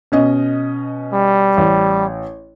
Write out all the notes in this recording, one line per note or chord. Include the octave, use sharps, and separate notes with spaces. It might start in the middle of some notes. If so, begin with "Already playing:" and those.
B2 C#4 D#5
G3
A1